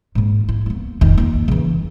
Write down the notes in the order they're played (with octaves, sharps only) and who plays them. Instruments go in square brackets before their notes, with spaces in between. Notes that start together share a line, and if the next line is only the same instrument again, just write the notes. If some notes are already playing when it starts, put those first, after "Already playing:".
[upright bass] G#2 A#3
E4
A#3 B3
F1 D#3
A#3 F4
C#3 E3